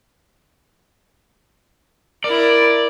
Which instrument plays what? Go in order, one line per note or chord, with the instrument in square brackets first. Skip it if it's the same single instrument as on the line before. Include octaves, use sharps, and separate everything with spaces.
[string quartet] E4 A#4 [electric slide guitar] D5